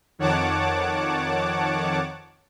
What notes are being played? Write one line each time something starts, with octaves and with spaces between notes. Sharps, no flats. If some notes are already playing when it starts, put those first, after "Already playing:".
F2 D#3 C#5 F#5 A5 D6